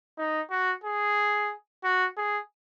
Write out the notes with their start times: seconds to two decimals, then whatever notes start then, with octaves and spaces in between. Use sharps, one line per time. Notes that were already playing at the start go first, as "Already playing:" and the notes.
0.18 D#4
0.50 F#4
0.84 G#4
1.84 F#4
2.17 G#4